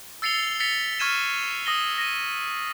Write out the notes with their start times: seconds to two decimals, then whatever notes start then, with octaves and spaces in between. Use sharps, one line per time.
0.22 E6 A6 C7 C#7 F7 G7
0.60 A6 B6 C#7 F7 G7
0.99 C#6 F6 G#6 D#7 E7
1.66 D#6 A#6 G7
1.98 A#6 D#7